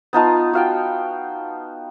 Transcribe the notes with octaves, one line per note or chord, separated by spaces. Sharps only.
B3 D#4 F4 A5
F#4 F5 G5